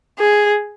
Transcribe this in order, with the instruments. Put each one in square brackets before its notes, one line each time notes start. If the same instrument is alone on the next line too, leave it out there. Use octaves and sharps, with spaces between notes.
[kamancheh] G#4